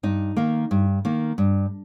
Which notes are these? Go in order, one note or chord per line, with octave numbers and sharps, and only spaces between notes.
G2 D#4
D#3 A#3
G2
D#3 A#3
G2